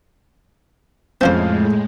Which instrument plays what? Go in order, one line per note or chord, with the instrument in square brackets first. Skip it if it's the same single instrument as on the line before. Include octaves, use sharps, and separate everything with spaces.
[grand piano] F2 F5 G6 [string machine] A2 G#3 [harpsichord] C4 C#4 C5